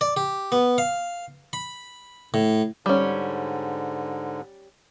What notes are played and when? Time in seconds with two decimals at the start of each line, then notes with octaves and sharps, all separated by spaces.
0.01 D5
0.17 G4
0.52 B3
0.78 F5
1.53 B5
2.34 A2
2.86 G#2 D3 G3 C#4